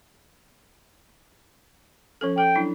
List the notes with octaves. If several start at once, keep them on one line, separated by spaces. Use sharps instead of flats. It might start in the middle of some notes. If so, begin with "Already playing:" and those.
F3 C#4 A4
A4 G5
F#3 D4 E4